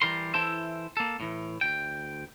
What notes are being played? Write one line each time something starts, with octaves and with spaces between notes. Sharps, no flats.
E3 G3 A#4 C6
E3 E4 A4 C5 E5
A#3 A4
A2 E3
D2 G5